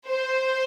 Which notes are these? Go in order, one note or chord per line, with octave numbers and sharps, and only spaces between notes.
C5